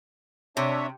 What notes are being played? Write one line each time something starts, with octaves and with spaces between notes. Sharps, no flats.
C3 D4 C#5 E5